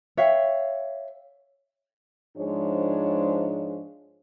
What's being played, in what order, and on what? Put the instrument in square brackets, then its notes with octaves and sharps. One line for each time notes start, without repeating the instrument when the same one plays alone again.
[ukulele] C#5 E5 F5 G5
[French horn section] G#2 F3 G#3 D4 C#5